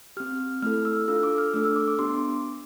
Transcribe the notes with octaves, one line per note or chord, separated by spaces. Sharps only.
C4 G4 F6
A3 E4 A4 F6
E6
D4 F4 A4 E6
D6
F6
A3 D4 A4 E6
E6
D6
D6
B3 D4 G4 C6